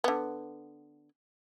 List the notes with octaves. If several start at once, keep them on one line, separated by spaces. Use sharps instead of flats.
D3 B3